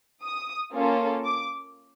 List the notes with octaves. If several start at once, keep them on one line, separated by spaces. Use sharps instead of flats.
D#6
A#3 C#4 F4 A4
D6